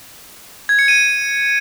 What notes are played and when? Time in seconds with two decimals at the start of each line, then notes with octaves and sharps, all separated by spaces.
0.69 G#6
0.79 C#7
0.88 D#7